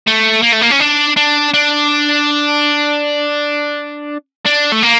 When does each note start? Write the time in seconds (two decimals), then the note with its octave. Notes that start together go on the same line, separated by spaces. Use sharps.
0.07 A3
0.43 A#3
0.53 A3
0.62 A#3
0.71 C#4
0.80 D4
1.16 D4
1.54 D4
4.46 D4
4.72 A3
4.82 A#3